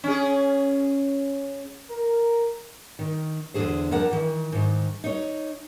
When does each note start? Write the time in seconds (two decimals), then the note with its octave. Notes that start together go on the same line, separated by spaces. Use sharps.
0.04 C#4 G#4
1.89 A#4
2.99 D#3
3.54 E2 G#2 D3 G#4 C5
3.91 F2 D4 A#4 F#5 A5
4.11 D#3 E3
4.52 G#2 D#3
5.04 D#4 C#5